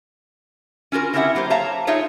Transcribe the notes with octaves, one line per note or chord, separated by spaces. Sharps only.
C#4 F4 F#4 A#4
C4 C#4 E4 G4 E5 F#5
F#3 A#3 G4 C5
C#5 E5 F5 A5 A#5
D#4 F4 G#4 C#5 E5 F5